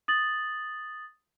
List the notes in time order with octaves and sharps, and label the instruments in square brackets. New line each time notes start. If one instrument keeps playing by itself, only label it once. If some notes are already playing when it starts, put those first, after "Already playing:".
[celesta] D#6 A6 F#7